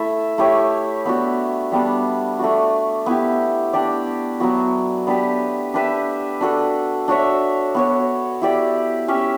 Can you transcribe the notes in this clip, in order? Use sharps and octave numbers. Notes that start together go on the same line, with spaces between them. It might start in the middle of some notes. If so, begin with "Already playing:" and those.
Already playing: A3 E4 A4 E5
A3 E4 G4 C#5
B3 D4 F#4
G3 B3 D4
A3 D4 F#4
B3 E4 G4
D4 G4 D5
F#3 B3 F#4
B3 D4 G4 B4
D4 G4 B4 E5
D4 F#4 A4
D4 F#4 C#5 E5
B3 F#4 C#5
E4 G4 D5
C#4 G4 C#5 E5